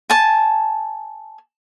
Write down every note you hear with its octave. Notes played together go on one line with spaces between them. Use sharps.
G#5 A5